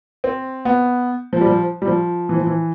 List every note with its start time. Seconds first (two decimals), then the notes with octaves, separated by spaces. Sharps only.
0.24 C4
0.65 B3
1.33 F3
1.41 G3
1.47 F3
1.82 G3
1.87 F3
2.29 E3
2.37 F3
2.47 E3